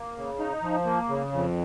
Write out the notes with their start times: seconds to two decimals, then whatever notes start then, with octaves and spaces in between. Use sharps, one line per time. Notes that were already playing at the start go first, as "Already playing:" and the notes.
Already playing: A#3
0.16 C#3
0.39 D#4
0.62 F3
0.85 A#3
1.09 C#3
1.32 F2